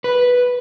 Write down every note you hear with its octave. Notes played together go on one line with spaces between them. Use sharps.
B4